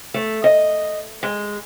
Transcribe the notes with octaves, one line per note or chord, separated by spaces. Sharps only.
A3
D#5
G#3